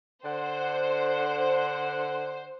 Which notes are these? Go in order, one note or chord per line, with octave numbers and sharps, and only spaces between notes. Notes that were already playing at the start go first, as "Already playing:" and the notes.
D3 C5 F#5